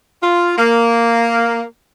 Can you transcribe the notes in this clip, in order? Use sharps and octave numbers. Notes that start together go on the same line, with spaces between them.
F4
A#3